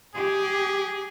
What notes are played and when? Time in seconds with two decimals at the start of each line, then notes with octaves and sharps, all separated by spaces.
0.15 G4 G#4